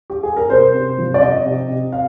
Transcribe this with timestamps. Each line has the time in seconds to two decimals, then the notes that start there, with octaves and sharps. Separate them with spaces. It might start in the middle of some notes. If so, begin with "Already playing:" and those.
0.10 G4
0.23 G#4
0.37 A#4
0.50 C3 C5
0.74 C3
0.98 F3
1.14 D5
1.21 C3 D#5
1.45 C3
1.70 C3
1.92 F5